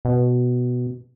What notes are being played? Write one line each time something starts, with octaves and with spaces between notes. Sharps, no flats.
B2